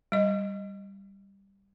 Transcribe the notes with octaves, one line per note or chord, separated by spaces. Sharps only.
G3 D#5